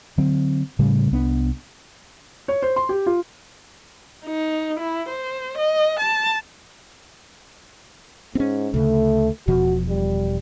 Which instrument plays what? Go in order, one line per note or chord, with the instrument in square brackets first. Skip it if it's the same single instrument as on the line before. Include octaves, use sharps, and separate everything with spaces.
[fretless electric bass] D3 F#3 C4
A2 C#3 G3 A3
C2 B3 D4
[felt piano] C#5
C5
C6
G4
F4
[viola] D#4
E4
C5
D#5
A5
[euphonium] G#2 [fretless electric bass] C4 C#4
[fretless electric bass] D2 C#3 [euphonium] A3
[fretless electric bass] E1 B2 F3 [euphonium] F#4
[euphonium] G3